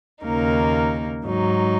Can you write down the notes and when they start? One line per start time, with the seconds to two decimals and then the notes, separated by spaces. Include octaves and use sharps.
0.24 D#2 C#3 A#3 D#4 A#4
1.25 G#2 F#3 D#4